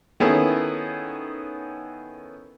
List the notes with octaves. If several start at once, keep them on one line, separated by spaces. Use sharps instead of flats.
D#3 B3 C#4 E4 G#4 A4